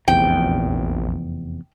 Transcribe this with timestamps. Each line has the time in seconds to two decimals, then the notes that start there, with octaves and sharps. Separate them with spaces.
0.08 F1 A#1 E2 C3 G5